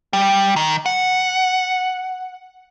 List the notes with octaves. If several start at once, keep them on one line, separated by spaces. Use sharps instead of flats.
G3
D#3
F#5